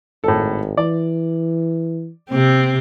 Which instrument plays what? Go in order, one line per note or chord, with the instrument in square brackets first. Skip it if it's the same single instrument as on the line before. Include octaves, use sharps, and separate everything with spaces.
[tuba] G#1 [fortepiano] A2 A4
[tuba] E3 [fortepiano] D5
[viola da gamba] C3 C4